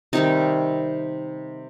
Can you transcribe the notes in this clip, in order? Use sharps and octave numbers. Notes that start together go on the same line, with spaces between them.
C3 D#3 G3 C4 D#4